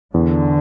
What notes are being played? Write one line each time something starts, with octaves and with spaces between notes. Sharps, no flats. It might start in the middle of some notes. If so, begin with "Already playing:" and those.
E2 D3